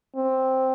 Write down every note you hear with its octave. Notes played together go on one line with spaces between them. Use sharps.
C4